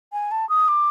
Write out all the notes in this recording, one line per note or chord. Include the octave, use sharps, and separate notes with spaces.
G#5
A5
D#6
D6